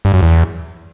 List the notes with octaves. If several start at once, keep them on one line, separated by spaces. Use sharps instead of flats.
G2
F#2
E2